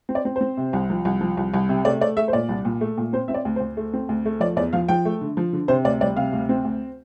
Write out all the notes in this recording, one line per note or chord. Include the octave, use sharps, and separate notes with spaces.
C4
D5
C4
C5
C4
C3
C2
F3
C2
F3
C2
C2
C3
A3 D5
A3 D5
A3 E5
C5
A#2 D5
C2
A#2
A3
A#2
C4 C5
C4 E5
D5
D2
D2 C5
A3
C4
D2
A3
F3 D5
E2 D5
F3 F5
F3 G5
A3
D3
F3
D3
C3 C5
D2 D5
G3 D5
C3 F5
D2
C4
D2